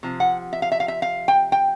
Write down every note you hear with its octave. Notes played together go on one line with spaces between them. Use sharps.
C3 F3
F#5
E5
F5
E5
F5
E5
F5
G5
G5